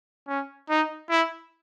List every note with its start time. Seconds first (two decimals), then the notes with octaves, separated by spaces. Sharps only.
0.28 C#4
0.69 D#4
1.09 E4